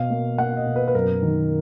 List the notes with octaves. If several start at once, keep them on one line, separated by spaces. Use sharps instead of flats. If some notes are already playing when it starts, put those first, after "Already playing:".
Already playing: B2 F5
A#3
A#3 F#5
D#5
B2
B4
B4
F#2 A#4
D#3